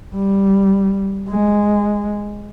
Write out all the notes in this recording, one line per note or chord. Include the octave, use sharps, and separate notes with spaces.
G3
G#3